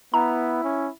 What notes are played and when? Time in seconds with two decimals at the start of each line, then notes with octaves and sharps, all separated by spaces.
0.14 B3 E4 A#5
0.64 C#4